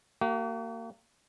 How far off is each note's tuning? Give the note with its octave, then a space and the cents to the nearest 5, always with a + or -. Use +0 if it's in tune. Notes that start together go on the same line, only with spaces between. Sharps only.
A#3 -30 F#4 +45